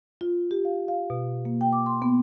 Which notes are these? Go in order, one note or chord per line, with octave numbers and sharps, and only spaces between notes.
F4
G4
F5
F5
B2
A#3
G5
D6
C6
B3